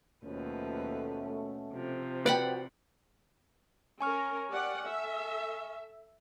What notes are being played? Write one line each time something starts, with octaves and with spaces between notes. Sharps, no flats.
D#2 B2 F3 A3 C#4 B4
C3 F3
F#4 B4 C5 D5 F#5 G5 B5
C#4 A#4 G#5 C#6 F6
G4 D5 F#5
A4 E5